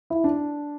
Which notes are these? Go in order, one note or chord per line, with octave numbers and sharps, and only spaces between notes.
E4
D4